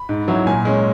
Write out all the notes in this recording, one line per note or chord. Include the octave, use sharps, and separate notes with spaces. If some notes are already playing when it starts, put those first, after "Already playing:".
Already playing: B5
G#2
F#3 C#4 E4
A#2 G#5
G#3 C#4